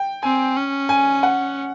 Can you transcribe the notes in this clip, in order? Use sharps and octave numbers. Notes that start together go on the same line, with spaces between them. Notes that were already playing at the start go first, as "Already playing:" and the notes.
Already playing: G5
C4 G#5
C#4
G#5
F#5